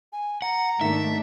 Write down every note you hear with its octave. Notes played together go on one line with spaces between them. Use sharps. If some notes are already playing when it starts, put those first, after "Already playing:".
G#5
F#5 A#5
G#2 D#3 A3 A#3 D4 E5